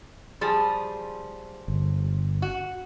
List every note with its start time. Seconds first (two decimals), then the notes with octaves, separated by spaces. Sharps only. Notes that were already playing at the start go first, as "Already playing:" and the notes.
0.41 F3 G3 G#4
1.68 G1
2.42 F#4